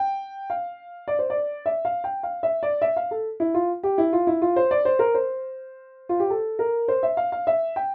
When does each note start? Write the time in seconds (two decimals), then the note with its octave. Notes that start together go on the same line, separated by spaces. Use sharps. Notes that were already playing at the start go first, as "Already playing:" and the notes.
Already playing: G5
0.50 F5
1.08 D5
1.19 C5
1.30 D5
1.66 E5
1.85 F5
2.04 G5
2.23 F5
2.43 E5
2.63 D5
2.82 E5
2.96 F5
3.11 A4
3.40 E4
3.54 F4
3.83 G4
3.98 E4
4.13 F4
4.27 E4
4.42 F4
4.56 C5
4.71 D5
4.85 C5
4.99 A#4
5.14 C5
6.09 F4
6.20 G4
6.30 A4
6.59 A#4
6.88 C5
7.03 E5
7.17 F5
7.32 F5
7.47 E5
7.76 G5